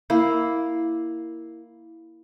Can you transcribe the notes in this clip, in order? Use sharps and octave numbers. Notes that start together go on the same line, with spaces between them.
A#3 E4